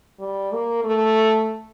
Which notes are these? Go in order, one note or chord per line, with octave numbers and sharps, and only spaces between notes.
G3
A#3
A3